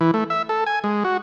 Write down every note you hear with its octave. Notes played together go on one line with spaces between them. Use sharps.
E3
A3
E5
A4
G#5
G#3
F#4